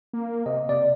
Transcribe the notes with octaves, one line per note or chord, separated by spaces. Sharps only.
A#3
C3 D#5
C3 D5